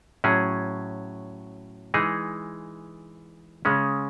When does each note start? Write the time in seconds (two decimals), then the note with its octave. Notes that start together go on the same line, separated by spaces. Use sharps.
0.24 A2 F#3 C#4 G#4
1.94 E3 G#3 D#4 G#4
3.65 C#3 G#3 C#4